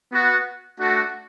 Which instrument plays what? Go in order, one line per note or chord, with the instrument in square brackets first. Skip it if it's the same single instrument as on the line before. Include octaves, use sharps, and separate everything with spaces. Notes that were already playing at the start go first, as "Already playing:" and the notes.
[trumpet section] B3 F#4
A3 D4 F#4